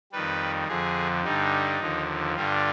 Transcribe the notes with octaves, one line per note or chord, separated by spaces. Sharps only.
F2 D#3 G3 B4
F2 D3 F3 G#4
G2 D3 G3 D#4
D#2 D3 F3
G2 D3 G3 F4